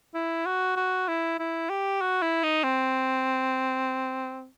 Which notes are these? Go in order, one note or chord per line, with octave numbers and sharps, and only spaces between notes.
E4
F#4
F#4
E4
E4
G4
F#4
E4
D#4
C4